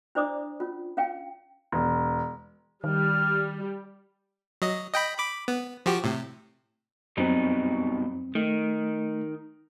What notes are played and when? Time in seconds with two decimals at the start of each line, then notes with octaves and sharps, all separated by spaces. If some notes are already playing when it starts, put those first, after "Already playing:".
0.15 D4 E4 C5 D5 D6 D#6
0.60 C#4 F4
0.97 C#4 F5 G5
1.72 E1
2.84 D#3 G3 F6
4.62 F#3 D#5
4.93 D#5 G5 B5
5.18 B5 D6
5.48 B3
5.86 F3 F#4 G4
6.04 A2 C3
7.17 F#2 B2 G3 C4 D#4
8.35 D#3 A3